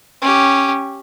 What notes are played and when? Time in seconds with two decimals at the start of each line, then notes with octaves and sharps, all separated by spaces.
0.22 C#4 G4